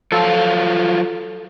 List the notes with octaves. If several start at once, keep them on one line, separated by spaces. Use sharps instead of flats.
F3 F#3 F4 A4